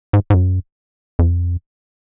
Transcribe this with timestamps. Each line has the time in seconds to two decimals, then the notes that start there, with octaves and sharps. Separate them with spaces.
0.13 G#2
0.30 G#2
0.34 F#2
1.19 F2